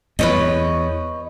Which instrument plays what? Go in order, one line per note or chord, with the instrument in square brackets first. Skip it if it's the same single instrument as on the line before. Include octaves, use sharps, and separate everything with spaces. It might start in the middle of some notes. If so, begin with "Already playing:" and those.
[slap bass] E2 [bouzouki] B4 C#5 D#5